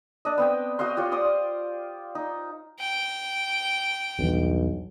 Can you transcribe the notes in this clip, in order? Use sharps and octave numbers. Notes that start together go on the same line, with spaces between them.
D4 D#5
B3 C4 G5
F#4 D#5 F5 C6
F4 G4 C#5
C5 D5 C6 D#6
D#4
G5
B1 E2 G2